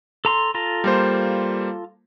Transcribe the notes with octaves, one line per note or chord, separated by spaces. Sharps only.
A4 A#5 C6
F4 A4 A#5
G3 A#3 C5